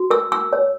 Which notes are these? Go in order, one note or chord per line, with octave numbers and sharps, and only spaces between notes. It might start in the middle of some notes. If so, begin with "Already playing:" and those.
Already playing: F#4
A#4 E6
E6
C#5